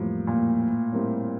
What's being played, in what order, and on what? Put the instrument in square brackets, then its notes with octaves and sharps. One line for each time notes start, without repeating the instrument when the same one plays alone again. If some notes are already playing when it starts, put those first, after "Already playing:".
Already playing: [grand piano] F2 E3 G3 A#3 F4 [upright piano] A2
[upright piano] A#2
[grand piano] A2 G3 C4 G4 A#4